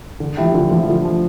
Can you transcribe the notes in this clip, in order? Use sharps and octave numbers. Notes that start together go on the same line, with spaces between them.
D3
F3 A3 E4 G4
D3 F4
F3 A3 F4
E4
D3 F4
F3 A3